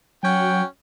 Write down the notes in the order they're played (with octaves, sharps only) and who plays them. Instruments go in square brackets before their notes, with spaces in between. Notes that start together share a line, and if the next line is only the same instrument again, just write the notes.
[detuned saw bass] F#3 [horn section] C#4 F#5 G5